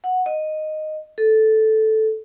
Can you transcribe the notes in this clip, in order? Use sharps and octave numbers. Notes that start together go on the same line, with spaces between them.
F#5
D#5
A4